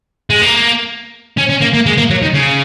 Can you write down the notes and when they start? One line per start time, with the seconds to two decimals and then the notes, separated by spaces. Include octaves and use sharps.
0.30 G#3
0.42 A#3
1.38 C#4
1.50 C#4
1.61 A#3
1.74 A#3
1.86 G#3
1.98 A#3
2.10 F#3
2.22 D#3
2.34 C#3